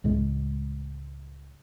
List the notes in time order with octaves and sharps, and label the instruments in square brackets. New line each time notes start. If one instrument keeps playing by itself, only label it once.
[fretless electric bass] C#2 A2 C#3 G#3